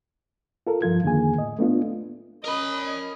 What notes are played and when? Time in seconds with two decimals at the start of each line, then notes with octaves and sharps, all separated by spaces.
0.67 F4 A4 A#4
0.82 G2 F3 F4 G#6
1.04 F2 D3 D#3 A#3 G#4 G#5
1.38 A2 D#5
1.59 A3 B3 D4 F4
2.44 C#4 A#4 D#5 B5